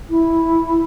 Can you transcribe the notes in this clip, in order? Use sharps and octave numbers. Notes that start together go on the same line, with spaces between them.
E4